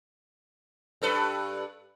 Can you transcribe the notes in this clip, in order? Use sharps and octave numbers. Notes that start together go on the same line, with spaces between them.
G2 A4 B4